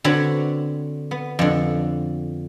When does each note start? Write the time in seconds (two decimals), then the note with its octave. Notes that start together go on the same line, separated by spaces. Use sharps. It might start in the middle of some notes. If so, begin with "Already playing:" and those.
0.04 D3 C4 F#4 B4 C#5
1.11 B3
1.39 F2 D3